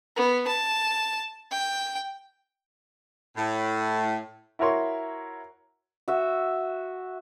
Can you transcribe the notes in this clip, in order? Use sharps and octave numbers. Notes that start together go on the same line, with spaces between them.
B3
A5
G5
A2
E4 F#4 A#4 C#5 C6 C#6
F#4 E5